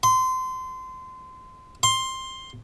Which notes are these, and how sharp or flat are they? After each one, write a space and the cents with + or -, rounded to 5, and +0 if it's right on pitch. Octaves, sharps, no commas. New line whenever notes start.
C6 -25
C6 +10